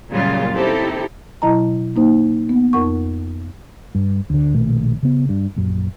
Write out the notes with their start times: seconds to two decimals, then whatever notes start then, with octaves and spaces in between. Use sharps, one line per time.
0.12 F#2 A#2 C#3 G3 F4
0.55 C4 D#4 E4 G4 A4
1.42 B2 F#3 E4 D#5 A5 A#5
1.96 A#3 D#4 C5
2.49 B3
2.73 F2 D#4 A#4 F#5 C#6
3.95 G2
4.30 D2 D3
4.54 A#1 B2 D#3 A3
5.03 C#3 B3
5.29 G2
5.56 A#1 F#2